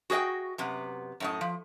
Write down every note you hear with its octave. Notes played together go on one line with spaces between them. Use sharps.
F#4 G#4 B4 D#5 G5
F#2 C3 B3
F#2 A2 D#5
F3